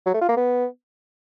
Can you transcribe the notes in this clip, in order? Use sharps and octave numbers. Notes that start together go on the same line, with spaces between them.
F#3
A3
F4
A#3
B3